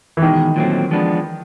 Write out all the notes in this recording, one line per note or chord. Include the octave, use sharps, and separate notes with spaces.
E3
E2 B2 D#3 G#3
A#2 F#3 A3 C4
F3 G#3 B3 D4